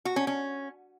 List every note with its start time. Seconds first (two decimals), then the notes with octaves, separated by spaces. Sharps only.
0.05 F#4
0.16 C#4
0.27 C#4